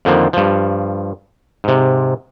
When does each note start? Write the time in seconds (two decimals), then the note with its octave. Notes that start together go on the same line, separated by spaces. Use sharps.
0.05 F2 D3 D#3 F3 A#3
0.33 G2 F3
1.64 G#2 C3